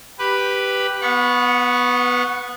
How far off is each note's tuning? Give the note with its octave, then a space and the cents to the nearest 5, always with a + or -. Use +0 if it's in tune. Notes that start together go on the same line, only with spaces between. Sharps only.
G4 +0 B4 +0
B3 +0 F#5 -35 C#6 +0